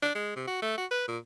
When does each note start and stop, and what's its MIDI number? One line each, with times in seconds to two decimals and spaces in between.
0.02 0.10 62
0.15 0.34 56
0.36 0.46 48
0.47 0.59 66
0.62 0.76 57
0.78 0.86 66
0.91 1.06 71
1.08 1.18 46